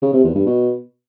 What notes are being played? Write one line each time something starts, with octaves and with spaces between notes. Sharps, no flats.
C#3
C3
E2
G2
B2